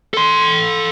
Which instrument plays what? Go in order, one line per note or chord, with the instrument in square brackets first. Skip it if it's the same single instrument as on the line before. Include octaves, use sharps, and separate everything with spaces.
[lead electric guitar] A4 C6